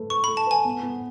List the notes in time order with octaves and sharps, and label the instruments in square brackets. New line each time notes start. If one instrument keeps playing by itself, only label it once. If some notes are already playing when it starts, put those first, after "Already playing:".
Already playing: [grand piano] A3 B4
[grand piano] B4 [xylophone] C#6
[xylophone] B5
[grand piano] A3
[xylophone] A5
[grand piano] B4 [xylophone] G#5
[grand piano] B3
B3